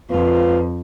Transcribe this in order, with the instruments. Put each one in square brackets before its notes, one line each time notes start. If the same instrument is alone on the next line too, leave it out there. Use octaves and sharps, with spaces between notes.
[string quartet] F2 [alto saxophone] F4 [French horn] B4